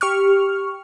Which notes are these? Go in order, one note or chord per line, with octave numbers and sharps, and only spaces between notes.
G4 C#6 F6